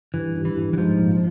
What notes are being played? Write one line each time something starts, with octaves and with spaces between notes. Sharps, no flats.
G2 E3
G2
E3
G2
E3
G#2 F3
A#1